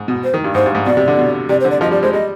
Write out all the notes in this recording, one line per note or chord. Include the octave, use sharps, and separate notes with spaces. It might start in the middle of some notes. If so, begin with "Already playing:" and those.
Already playing: G#2
B2
C5
D#3
G2
G#2 C5
G2
G#2
B2 D5
C3
D3
B2
C3 D5
C5
D3
D5
F3 D#5
G3 D5
G#3 C5
G3 D#5